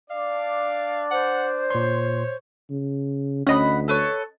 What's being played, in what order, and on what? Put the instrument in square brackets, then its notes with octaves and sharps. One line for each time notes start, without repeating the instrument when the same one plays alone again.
[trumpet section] D4 D5 [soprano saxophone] F5
[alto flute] C5 [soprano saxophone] F#5
[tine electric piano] A#2 C6 [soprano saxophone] C#5
[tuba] C#3
[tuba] D2 [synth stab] C#4 D#5 [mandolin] F#5 B5
[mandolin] A4 B4 C#5